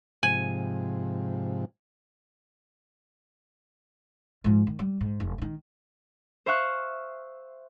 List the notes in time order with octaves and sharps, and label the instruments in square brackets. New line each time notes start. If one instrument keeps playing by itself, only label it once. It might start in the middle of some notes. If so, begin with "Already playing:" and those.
[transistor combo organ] G#2 C3 F3 [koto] G#5
[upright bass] G#2 F3
D#3
G3
G#2
F1
D3 D#3
[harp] C5 E5 F5 C#6 F#6